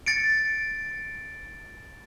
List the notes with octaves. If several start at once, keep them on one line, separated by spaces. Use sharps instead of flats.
A6 C#7 D7